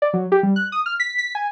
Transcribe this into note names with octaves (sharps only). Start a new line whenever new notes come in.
D5
F#3
G4
G3
F#6
D#6
F6
B6
B6
G#5